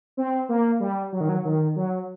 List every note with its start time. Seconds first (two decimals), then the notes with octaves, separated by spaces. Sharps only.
0.17 C4
0.49 A#3
0.80 G3
1.12 F#3
1.21 D#3
1.29 F#3
1.45 D#3
1.76 F#3